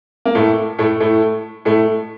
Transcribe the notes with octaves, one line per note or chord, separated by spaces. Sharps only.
A#3
A2 A3
A2 A3
A2 A3
A2 A3